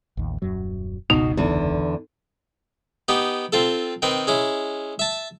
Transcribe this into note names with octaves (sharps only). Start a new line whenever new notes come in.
A1 D#2
D#1 F#2 F#3
F#1 C#2 B2 D#4
E2 D3
B3 D#4 G4
C4 F4 A4
D#3 C4 A#4 B4
G#3 C#4 E4
E5 A5